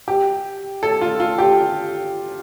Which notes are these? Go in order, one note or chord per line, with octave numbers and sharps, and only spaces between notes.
G4
A4
F4
F4
G4